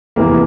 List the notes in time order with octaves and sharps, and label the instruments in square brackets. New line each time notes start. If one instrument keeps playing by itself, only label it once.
[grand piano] F1 E2 C3 E3 A#3